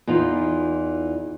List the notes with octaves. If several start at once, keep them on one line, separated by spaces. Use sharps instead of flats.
E2 E3 D#4 F4